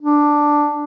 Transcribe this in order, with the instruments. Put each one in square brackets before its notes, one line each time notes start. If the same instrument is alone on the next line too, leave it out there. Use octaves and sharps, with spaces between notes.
[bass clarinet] D4